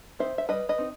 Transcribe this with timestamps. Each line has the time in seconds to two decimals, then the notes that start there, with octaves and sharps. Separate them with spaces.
0.19 C4 D#4 C5 E5
0.38 E5
0.49 G3 B4 D#5
0.69 B4 D#5
0.78 C4 D#4